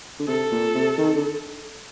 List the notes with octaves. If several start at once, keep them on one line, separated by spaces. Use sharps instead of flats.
D3
C3 A4
A#2
C3
D#3
D3